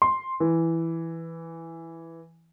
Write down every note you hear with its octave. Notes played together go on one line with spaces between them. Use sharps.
C6
E3